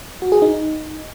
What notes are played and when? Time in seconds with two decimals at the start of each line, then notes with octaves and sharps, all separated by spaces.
0.22 F#4
0.32 G#4
0.42 D#4